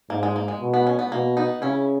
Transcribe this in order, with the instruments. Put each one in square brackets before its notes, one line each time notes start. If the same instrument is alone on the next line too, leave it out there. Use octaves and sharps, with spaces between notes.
[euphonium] G#2 [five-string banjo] A#3
[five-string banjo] G#3
A#3
G#3
[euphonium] B2
[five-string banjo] B3
C#4
B3
[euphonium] B2 [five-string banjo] A#3
[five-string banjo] B3 D#4
[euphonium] C#3 [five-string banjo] C#4 E4